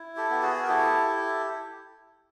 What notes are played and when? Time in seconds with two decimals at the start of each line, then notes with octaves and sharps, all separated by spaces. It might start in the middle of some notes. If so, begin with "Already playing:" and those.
Already playing: E4
0.16 G4 A4
0.30 B3 G4
0.43 F#4 G#4
0.63 A#4
0.68 E4 G4 A4
1.07 E4